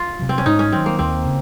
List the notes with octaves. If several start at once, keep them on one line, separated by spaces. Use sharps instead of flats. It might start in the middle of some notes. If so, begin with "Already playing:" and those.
Already playing: F4
C3 F#3
C4
C#4
G#2 D#4
C#4
D#3 F#3 C4
A#3
D#2 C4
C#3